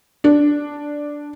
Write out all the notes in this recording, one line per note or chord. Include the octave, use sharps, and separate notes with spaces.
D4